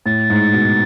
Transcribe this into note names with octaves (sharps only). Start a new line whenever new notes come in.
A2 A6
G#2
B2